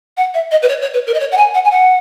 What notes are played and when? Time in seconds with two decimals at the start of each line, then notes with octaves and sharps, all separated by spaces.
0.17 F#5
0.34 E5
0.51 D#5
0.62 B4
0.69 C#5
0.82 C#5
0.94 B4
1.07 A#4
1.14 D#5
1.20 C#5
1.32 F#5
1.38 G#5
1.54 F#5
1.65 G#5
1.71 F#5